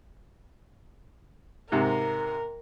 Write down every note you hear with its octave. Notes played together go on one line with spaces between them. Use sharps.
G#2 C3 A#4